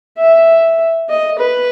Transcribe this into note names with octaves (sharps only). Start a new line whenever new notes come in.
E5
D#5
B4